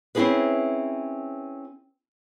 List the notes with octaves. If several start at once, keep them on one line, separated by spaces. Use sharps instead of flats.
C4 C#4 E4 G4 G#4 B4